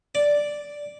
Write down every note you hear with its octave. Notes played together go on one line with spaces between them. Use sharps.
D5